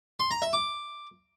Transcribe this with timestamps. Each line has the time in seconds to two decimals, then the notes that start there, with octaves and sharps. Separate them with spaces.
0.20 C6
0.31 A#5
0.42 E5
0.53 D6